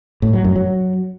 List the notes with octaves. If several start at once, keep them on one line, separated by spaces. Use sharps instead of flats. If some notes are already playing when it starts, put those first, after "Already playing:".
A2
F#3
F#2
F#3